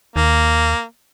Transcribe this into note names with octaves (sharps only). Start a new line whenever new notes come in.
D#2 A#3